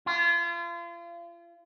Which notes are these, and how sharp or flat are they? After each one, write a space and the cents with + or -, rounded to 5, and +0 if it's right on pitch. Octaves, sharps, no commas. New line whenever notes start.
F4 -35